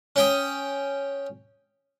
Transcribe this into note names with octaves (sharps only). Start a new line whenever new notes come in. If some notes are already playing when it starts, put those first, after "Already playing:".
C#4 G5 D#6